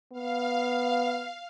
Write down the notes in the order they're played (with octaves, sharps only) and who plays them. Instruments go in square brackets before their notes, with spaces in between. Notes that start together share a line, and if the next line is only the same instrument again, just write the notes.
[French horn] B3 [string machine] F5